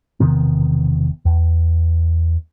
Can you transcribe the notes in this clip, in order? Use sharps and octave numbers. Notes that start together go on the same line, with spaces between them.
E1 C3 D#3 B3
E2